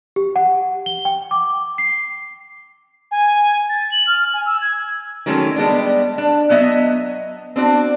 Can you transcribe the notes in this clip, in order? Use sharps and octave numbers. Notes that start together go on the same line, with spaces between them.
G4
F#5
G7
G5
D6
C7
G#5
A6
F#7
F6
G#5
E6
G#6
D#3 F#3 G#3 A3 C4 C#4
G3 G#3 B3 D4
D4
F#3 B3 D#5 E5
C4 D4 F#4